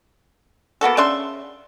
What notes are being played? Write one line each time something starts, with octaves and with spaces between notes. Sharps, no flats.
A#3 B3 F#4 A4
C#3 D4 E5 C6